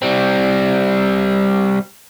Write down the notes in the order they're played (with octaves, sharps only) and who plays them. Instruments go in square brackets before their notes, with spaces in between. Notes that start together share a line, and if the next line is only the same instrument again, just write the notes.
[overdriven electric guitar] G3 C4